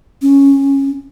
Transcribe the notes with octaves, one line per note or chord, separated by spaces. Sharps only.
C#4